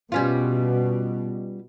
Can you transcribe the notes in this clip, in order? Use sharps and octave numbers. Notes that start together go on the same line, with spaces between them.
B2 G3 C#4 F4